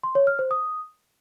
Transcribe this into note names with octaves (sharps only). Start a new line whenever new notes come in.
C6
C#5
F6
C5
D#6